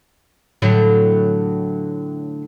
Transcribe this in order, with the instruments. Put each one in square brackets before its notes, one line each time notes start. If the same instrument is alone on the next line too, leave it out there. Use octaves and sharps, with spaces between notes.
[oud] A2 D3 F#3